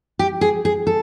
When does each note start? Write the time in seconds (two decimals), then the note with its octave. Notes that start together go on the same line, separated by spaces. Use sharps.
0.19 G4
0.41 G#4
0.65 G#4
0.87 A4